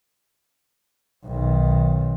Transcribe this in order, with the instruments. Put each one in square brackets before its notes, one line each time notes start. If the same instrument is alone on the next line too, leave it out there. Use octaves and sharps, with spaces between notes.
[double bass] B1 D#3